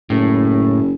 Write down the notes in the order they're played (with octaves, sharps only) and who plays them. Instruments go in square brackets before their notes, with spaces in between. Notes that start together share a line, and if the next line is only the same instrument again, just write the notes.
[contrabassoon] F#1 [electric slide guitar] A2